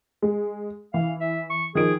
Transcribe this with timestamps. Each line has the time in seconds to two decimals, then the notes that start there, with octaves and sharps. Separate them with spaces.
0.22 G#3
0.94 E3 E4 F5
1.21 E5
1.50 C#6
1.75 D#3 F3 G#4 D7